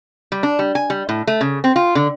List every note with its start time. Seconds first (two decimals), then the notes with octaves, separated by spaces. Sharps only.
0.32 G3
0.43 D4
0.59 G3
0.75 G#5
0.90 G3
1.09 A2
1.27 A3
1.41 C#3
1.64 C4
1.76 F4
1.95 D3